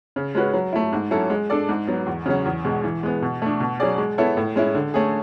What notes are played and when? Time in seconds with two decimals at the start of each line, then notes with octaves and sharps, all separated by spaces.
0.16 C#3
0.35 G#3 C#4 F#4 B4
0.54 F#3
0.73 A3 E4
0.93 G#2
1.11 F#3 C#4 E4 A4
1.30 G#3
1.50 D4 A4 D5
1.69 G#2
1.87 F#3 B3
2.07 E2
2.26 C#3 F#3 C#4
2.46 E2
2.65 B2 G#3
2.84 E3
3.03 G#3 B3
3.22 B2
3.42 A3 D4
3.60 B2
3.80 F#3 C#4 G#4 D5
3.98 G#3
4.18 B3 E4 A4 C#5
4.37 A2
4.56 G#3 C#4 E4
4.75 D3
4.94 A3 C#4 G#4